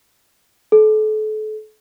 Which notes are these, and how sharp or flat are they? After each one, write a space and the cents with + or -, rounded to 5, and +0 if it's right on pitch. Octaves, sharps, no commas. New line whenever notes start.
A4 -35